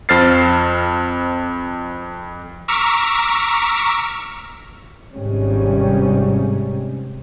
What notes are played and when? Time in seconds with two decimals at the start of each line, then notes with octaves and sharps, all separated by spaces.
0.09 F2 C5 F6 A6 C7
2.68 A#5 C#6 D6 E6 F6 B6
5.12 G#1 G#2 C3 G3 G#3 C#4